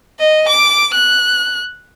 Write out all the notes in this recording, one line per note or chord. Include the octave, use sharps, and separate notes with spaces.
D#5
D6
F#6